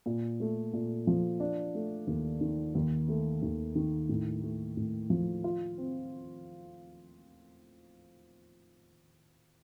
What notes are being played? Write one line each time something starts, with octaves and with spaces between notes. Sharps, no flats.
A#2
A3
A#2
F3
D4
A3
D#2
D#3
D#2
A3
D#2
D#3
A2
A3
A2
F3
F4
C4